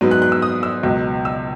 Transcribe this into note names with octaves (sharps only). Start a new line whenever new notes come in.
G#2 F#3 B3
F#6
F#6
E6
D#6
E6
C#2 B2 F#3
E6